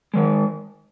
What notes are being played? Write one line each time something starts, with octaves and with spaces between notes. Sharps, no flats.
D#3 G#3